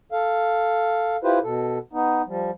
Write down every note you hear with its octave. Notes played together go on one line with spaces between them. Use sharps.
A4 F5
E4 F4 G4 B4 C5
B2 A4
B3 D#4
F3 G3